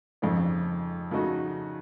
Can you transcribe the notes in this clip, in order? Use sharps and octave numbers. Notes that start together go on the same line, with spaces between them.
F2 C#3 F3 A3 D#4
C#3 F3 A3 D#4 F#4